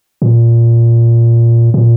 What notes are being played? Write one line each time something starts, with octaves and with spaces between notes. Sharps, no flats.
A#2
A#2